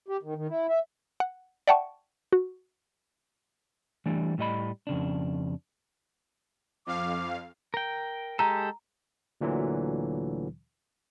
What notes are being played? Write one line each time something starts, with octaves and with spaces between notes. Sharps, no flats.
G4
D#3
D#3
E4
E5
F#5
D5 E5 F#5 G5 A5 C#6
F#4
E3 G3 A3 D4
A2 G3 D#5 B5
F2 C#3 D4
F2 F5 D6
A#4 G5
G#3 G4 A4 A#5
D2 A#2 D3 E3 F#3